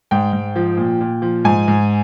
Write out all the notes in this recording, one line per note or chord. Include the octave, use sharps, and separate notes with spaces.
G#2 G5
G#2
F3
A#2
A#2
F3
G#2 G#5
G#2